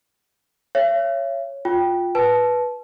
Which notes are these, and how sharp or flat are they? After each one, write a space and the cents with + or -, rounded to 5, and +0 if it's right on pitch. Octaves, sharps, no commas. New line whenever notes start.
C#5 +0 E5 +45
F4 +15 G5 +0
B4 -10 A5 -20